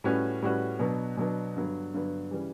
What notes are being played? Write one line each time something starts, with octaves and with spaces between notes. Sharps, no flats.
A2 G3 C#4 F#4 B4
A2 G3 C#4 F#4 B4
B2 F#3 B3 D4
B2 F#3 B3 D4
G2 D3 F#3 B3
G2 D3 F#3 B3
C#3 E3 G3